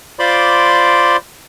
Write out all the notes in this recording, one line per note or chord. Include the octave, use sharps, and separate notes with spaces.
F4 C5 D5 B5 C6 D6